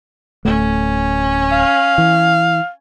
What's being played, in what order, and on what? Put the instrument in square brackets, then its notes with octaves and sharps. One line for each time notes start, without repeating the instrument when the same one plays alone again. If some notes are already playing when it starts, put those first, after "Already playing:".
[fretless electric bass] D1 A3 [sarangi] C#4
[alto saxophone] F5
[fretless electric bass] E3